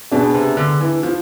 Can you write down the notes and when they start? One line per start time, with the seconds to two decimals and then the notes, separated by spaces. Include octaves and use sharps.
0.11 B2 B3 D4 G#4
0.34 C3
0.57 D3
0.81 E3
1.03 F3